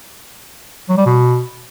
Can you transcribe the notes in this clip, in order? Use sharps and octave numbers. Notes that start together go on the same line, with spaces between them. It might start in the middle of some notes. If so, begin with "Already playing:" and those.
F#3
G3
B2